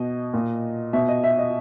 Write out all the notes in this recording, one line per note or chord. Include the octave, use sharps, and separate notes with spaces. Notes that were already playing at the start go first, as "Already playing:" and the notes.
Already playing: B2 D#5
A#2
B2 E5
D#5
E5
D#5